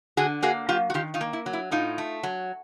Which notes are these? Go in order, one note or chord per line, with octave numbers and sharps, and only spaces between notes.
D3 F#4 G#4
A#3 F#4 G#4
F#3 F4 G4
F#4
D#3 F4 G4
D#4 F4
A#3
E4
F#3
E4
A2 D#4 F4
A3
F#3